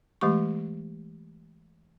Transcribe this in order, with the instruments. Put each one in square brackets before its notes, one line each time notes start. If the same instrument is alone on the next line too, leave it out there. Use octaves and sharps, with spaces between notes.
[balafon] E3 G#3 A3 G4 C#6